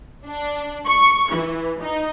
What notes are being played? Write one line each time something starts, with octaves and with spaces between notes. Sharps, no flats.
D4
C#6
E3
D#4